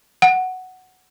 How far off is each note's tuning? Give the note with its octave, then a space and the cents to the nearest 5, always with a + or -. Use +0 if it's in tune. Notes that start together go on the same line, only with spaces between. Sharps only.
F#5 +5